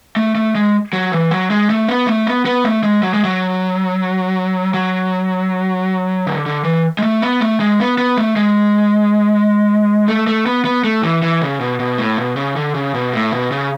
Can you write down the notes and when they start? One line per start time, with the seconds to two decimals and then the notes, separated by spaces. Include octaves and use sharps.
0.16 A3
0.35 A3
0.55 G#3
0.93 F#3
1.12 E3
1.31 F#3
1.50 G#3
1.70 A3
1.88 B3
2.07 A3
2.27 B3
2.46 B3
2.64 A3
2.83 G#3
3.03 F#3
3.14 G#3
3.24 F#3
4.74 F#3
6.27 D3
6.46 D3
6.64 E3
6.99 G#3
7.03 A3
7.22 B3
7.41 A3
7.60 G#3
7.80 B3
7.98 B3
8.17 A3
8.36 G#3
10.08 A3
10.27 A3
10.46 B3
10.65 B3
10.84 A3
11.03 E3
11.22 E3
11.42 C#3
11.60 B2
11.80 B2
11.98 A2
12.18 B2
12.36 C#3
12.56 D3
12.75 C#3
12.94 B2
13.14 A2
13.32 B2
13.51 C#3